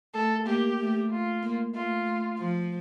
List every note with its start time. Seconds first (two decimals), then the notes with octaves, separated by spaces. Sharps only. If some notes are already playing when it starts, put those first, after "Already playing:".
0.14 A3 A4
0.46 A#3 G4
0.79 A3
1.10 F4
1.43 A#3
1.74 A3 F4
2.05 A3
2.38 F3